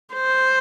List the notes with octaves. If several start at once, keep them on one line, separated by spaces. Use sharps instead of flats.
C5